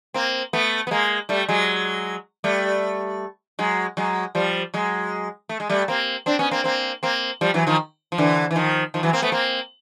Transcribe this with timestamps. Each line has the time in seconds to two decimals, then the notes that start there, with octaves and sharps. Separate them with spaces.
0.14 A#3 C4
0.53 A3 B3
0.87 B3
0.91 G#3 A#3
1.29 G3 A3
1.48 F#3 G#3
2.44 G3 A3
3.59 F#3 G#3
3.97 F#3 G#3
4.35 F3 G3
4.74 F#3 G#3
5.49 A3
5.60 G#3
5.69 G3 A3
5.88 A#3 C4
6.26 C4 D4
6.39 B3 C#4
6.51 A#3 C4
6.64 A#3 C4
7.03 A#3 C4
7.41 F3 G3
7.54 E3 F#3
7.67 D#3 F3
8.12 F3
8.18 D3 E3
8.51 E3
8.56 D#3 F3
8.94 D#3 F3
9.03 E3 F#3
9.13 A#3 C4
9.22 A3 B3
9.32 A#3 C4